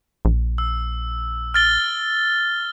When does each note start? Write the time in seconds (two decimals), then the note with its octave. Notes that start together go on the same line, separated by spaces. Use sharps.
0.25 A#1
0.58 E6
1.54 F6 A6 G7